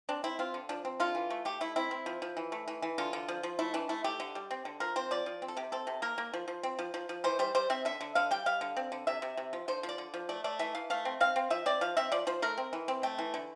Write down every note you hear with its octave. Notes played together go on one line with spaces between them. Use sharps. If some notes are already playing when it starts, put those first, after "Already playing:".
C4 D4
C4 E4
C4 F4
D3
F3 D4
C4
D3 F4
E3
A3
A3 G4
A3 E4
C4 E4
C4
F3
F3
E3
A3
E3
E3
D3 F4
D3
F3
F3
A3 E4
E3 D4
A3 E4
A3 G4
D3
G3
C4
D3
F3 A#4
C4 C5
F3 D5
F3
C4
A4
C3 G4
C4 A4
C3
A#3 A#4
A#3
F3
F3
C4
F3
F3
F3
E3 C5
G3 C5
G3 C5
C4 E5
D3 E5
D3
D3 F5
G3 G5
G3 F5
D3
C4
D3
C3 E5
C3
C3
F3
D3 C5
F3
D5
D3
F3
A3 D5
A3 D5
E3 E5
E3 F5
A3 F5
C4
C4 F5
C4
F3 E5
C4 D5
F3 F5
C4 E5
F3 D5
F3 C5
A3 A#4
C4
E3
C4
A3 G5
E3
D3